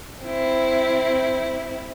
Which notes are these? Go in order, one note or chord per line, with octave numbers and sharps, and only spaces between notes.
C4 E4